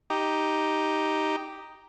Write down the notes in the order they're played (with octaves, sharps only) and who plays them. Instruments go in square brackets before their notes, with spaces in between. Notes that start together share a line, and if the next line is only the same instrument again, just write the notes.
[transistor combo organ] D#4 G4